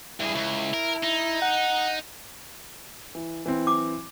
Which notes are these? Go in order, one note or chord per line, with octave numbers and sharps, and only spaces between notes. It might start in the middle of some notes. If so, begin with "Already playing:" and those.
G2 E4 G#4
C#2
A#4
D#4
F#5
E3
E3 C4
D6